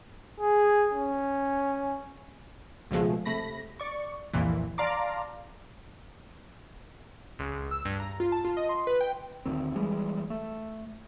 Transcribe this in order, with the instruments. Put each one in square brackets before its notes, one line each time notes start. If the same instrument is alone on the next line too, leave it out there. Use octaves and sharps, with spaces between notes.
[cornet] G#4
C#4
[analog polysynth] C#2 B2 F3 G#3 A3
C3 A3 B5 A#6
D5 C#6
C2 F2 A#2 E3
D5 F5 A5 A#5 C6 D6
[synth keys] C#2
C#2
E6
G2
A#5
F4
A5
F4
D#5
C6
B4
G5
[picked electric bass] D2 D#3 C4
E3 G3 G#3
A3